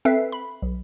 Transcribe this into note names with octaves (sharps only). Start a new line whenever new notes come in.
C4 A4 B4 E5 C7
B5
B1